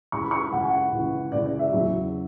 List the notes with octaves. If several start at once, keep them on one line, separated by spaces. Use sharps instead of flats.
C#2 C#3 E3 C#6
B5
C#6
C#2 C#3 E3 F#5
G#5
F#5
C#2 C#3 E3
C#2 C#3 E3 D5
D5
E5
E2 C#3 F#3